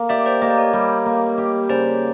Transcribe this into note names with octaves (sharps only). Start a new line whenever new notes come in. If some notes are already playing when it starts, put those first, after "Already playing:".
Already playing: A#3
G4 D5 E5
C5 D5
A#3 D#5
D5
C#5 D#5
G3
A#3
G4
C#3 C5 D5